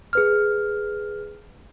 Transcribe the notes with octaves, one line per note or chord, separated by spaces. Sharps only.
G#4 B4 F6